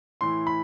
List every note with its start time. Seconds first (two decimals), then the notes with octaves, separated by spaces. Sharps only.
0.21 A2 E3 C6
0.47 B5